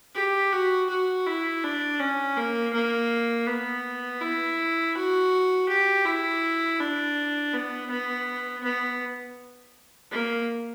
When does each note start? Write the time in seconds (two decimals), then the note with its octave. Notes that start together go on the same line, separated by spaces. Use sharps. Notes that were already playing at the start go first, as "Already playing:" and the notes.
0.15 G4
0.52 F#4
0.89 F#4
1.26 E4
1.63 D4
2.00 C#4
2.37 A#3
2.73 A#3
3.47 B3
4.21 E4
4.95 F#4
5.68 G4
6.05 E4
6.79 D4
7.53 B3
7.90 B3
8.63 B3
10.11 A#3